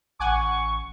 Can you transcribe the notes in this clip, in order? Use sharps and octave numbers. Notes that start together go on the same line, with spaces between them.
A1 F#5 G#5 C#6 D6